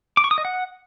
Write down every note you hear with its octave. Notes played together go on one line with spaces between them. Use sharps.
D6
C#6
D#6
D#5
F#5